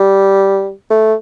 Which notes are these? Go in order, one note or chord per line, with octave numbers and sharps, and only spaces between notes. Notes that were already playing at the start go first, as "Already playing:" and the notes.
Already playing: G3
A3